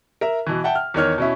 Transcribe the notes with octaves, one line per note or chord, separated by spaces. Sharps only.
A#4 E5
B2 E3
E5 F#5 G5 A5
F6
E2 D#3 C#5 F6
B2 C#4 E4